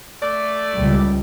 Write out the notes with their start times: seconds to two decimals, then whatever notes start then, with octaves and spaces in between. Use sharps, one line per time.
0.21 A3 D5
0.76 C#2 G3